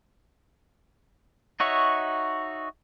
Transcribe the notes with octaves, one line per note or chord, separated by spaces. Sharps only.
D#4 F#4 C#5 E5